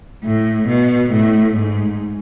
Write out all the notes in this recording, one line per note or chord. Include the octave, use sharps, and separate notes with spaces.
A2
B2
A2
G#2